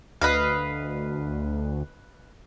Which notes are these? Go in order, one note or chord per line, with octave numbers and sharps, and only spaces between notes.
D2 B4 D#5 F5